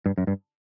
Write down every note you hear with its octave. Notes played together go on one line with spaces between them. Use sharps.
G2
F#2
G2